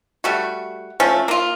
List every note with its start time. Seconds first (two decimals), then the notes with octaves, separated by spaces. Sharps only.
0.24 G3 A3 F#4
1.00 F3 A3 C#4
1.28 A#3 F4